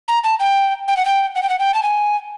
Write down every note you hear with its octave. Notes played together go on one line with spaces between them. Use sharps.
A#5
A5
G5
G5
F#5
G5
F#5
G5
F#5
G5
A5
G#5